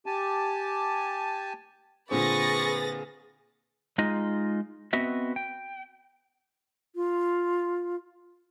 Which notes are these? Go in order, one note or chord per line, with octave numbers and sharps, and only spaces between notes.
G4 G#5 A5
A#2 D3 C4 G#4 B4 C#6 A6 A#6
G#3 D#4 F4 D#5
B3 C4 F#4 D#5 E5
G5
F4